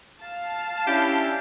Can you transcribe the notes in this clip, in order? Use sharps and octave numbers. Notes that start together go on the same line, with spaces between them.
F5 A5
C#4 D4 E4 G4